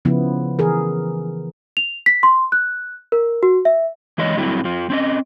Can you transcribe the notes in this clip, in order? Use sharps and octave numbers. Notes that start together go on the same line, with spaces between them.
C#3 F3 B3 E4
E3 G#4 A#4
F7
B6
C6
F#6
A#4
F#4
E5
E3 G#3 B4 C#5 D#5
G2 F#3 A3 C4 E4
F2 F3
C4 C#4 D#5